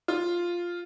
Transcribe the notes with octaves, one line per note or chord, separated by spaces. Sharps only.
F4